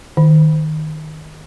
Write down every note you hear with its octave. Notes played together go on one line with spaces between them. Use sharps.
D#3